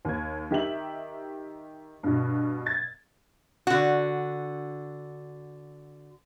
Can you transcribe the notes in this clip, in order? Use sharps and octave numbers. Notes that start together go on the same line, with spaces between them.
D#2 G#6
D#3 G4 E5 F#7
G2 B2
G#6 A6
D3 F#4